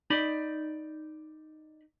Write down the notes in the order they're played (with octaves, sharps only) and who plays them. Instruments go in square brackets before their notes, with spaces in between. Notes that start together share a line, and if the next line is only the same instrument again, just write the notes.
[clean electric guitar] D#4 D5 B5